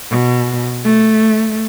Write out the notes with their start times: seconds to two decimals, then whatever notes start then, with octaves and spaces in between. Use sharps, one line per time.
0.10 B2
0.83 A3